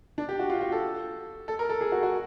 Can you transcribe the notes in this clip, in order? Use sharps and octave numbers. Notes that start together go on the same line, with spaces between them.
D4
G4
F#4
F4
F#4
A4
A4
A#4
A4
G#4
F#4
F#4